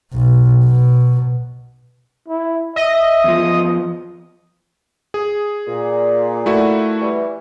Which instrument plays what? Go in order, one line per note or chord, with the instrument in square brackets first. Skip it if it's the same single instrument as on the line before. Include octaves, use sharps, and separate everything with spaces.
[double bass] B1
B2
[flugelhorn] E4
[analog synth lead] D#5 [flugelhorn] E5
[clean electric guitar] E2 F3
[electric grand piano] G#4
[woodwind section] A#2
[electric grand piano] A3 E4 F#4
[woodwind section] E3 G3